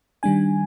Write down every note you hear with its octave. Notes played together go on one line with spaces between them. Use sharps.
D#3 G3 D4 G#5